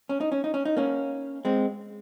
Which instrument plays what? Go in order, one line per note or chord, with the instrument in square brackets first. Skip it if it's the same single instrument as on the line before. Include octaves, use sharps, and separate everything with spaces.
[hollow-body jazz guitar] C#4
D#4
C#4
D#4
C#4
D#4
A#3 C#4
G#3 C4